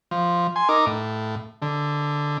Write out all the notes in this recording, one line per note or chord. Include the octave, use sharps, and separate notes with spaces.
F3
G#5 C6
D#4 A#4 D6
A2
D3